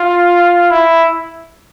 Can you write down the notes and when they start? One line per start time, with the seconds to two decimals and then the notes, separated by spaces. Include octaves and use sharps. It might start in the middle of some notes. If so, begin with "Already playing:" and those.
Already playing: F4
0.70 E4